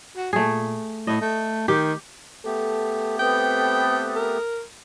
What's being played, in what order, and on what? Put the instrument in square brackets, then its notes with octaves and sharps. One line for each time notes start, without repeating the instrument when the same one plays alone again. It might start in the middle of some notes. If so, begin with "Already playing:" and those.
[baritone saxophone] F#4
[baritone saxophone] A#2 [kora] A3 G#4
[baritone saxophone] A2 [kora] D#5
[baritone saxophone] A3
[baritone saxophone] D#3 [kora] G4
[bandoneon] A3 B3 G4 [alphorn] A4
[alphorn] C4 [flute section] A4 B4 D#6 [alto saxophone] G5
[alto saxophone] A#4